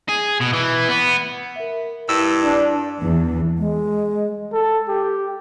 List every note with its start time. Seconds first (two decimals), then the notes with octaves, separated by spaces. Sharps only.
0.09 G#4
0.40 B2
0.53 E3
0.89 B3
1.56 A#4 E5
2.09 G2 E4 E6
2.44 D4
3.02 E2
3.59 G#3
4.53 A4
4.88 G4